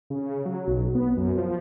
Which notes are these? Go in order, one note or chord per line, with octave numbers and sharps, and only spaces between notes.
C#3
F#3
B1
B3
F#2
F3